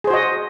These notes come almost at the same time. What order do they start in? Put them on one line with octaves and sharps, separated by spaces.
G#4 C5 F#4 D#5